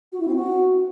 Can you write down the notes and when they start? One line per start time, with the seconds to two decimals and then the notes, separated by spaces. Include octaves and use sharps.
0.12 F#4
0.20 E4
0.28 C4
0.35 F#4